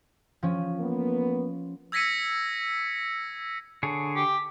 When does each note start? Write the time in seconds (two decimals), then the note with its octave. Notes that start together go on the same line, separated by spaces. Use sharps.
0.43 F3 C#4
0.79 A#3 B3
1.92 E6 G#6 A#6 B6 C#7 D#7
3.83 D3 G#4 C#5
4.16 G4